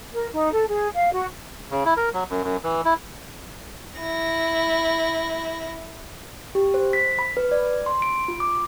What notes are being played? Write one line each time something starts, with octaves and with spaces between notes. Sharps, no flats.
A#4
D#4
A4
G#4
F5
F#4
C#3
E4
A#4
F#3
F#2
F#2
E3
E4
E4 A#6
G4
C5
B6
B5
B4
D5
C6
D7
F4
D6